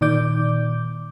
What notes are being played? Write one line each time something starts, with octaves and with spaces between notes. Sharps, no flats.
A#2 D#3 D5 D6 G6